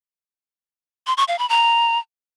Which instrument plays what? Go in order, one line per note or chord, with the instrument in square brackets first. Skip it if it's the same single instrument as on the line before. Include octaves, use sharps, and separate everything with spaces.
[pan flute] C6
C#6
F5
B5
A#5